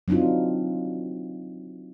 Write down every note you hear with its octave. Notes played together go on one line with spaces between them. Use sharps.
F#3 C4 D4 D#4 F4